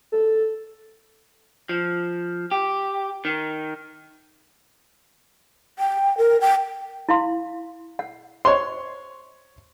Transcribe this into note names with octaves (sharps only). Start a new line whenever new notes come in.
A4
F3
G4
D#3
G5
A#4
G5
E4 F5 C6
F#5
C5 C#5 C6